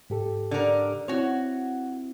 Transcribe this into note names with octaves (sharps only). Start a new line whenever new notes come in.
G#2 G4 A4
D3 A#4
C4 E4 F#4 C#5